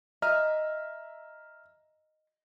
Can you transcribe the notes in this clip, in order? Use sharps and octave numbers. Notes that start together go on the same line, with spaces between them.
D#5 E5 A#5 F6